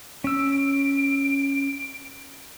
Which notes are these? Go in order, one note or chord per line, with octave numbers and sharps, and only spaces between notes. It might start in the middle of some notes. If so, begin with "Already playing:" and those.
C#4 E6 D7